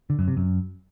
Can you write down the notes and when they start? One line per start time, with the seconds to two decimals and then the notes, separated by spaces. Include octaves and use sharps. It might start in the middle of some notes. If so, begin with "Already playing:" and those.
0.10 D3
0.19 F#2
0.28 C3
0.37 F#2